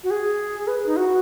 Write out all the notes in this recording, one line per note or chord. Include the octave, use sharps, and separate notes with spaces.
F#4
G#4
B4
D#4
F#4